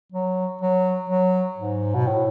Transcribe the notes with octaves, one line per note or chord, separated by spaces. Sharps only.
F#3
F#3
F#3
G#2
B2
A2